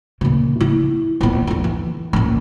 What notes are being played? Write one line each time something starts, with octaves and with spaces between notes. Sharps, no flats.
A#2 C#3
E4
A#1 B3
F2 D4
E3
A#1 C#4